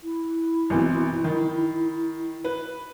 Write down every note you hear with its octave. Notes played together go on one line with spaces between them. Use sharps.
E4
G#1 B2 E3
D#3
B4